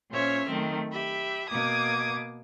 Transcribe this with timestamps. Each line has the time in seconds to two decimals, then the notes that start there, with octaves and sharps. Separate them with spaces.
0.11 A#2 C#4 C5 C#5 E5 F6
0.48 D#3 F#3 A3 C4
0.92 G4 E5 B5
1.49 B2 A#3 D6 D#6 G#6